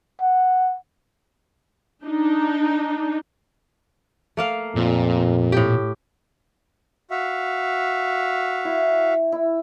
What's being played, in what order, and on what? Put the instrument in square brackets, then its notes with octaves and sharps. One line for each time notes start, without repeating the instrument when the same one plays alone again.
[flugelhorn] F#5
[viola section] D4 D#4
[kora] A3 A#3 F5
[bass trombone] F2 [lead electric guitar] A#2
[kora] A2 G4
[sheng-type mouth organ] F#4 E5 F5
[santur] E4
E4